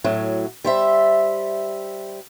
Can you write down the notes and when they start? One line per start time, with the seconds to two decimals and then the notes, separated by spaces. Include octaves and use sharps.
0.04 A2 F#3
0.64 G3 C5 E5